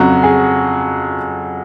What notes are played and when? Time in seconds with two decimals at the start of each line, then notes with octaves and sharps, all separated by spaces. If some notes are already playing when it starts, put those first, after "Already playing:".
Already playing: F2 C#3 F#3 F#4
0.23 G#4